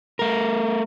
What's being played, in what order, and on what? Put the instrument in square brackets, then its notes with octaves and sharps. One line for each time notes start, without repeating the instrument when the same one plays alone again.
[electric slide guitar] A3 A#4